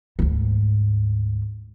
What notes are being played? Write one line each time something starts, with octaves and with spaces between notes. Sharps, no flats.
D2 G#2